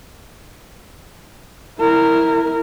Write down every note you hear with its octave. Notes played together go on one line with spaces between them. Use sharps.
E4 A#4